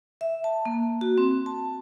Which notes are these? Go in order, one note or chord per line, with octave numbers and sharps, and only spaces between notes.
E5
A5
A#3
F#4
C4
A5